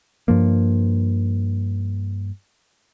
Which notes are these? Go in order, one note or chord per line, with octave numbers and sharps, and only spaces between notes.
G2 F3 A#3